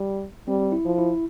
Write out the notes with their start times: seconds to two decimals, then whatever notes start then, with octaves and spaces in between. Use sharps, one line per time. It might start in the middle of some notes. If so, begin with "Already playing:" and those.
Already playing: G3
0.48 G3 C4
0.72 E4
0.85 F3
0.98 E4